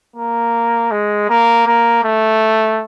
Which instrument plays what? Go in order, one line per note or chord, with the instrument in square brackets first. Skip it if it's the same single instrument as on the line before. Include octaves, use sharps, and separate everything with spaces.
[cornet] A#3
G#3
A#3
A#3
A3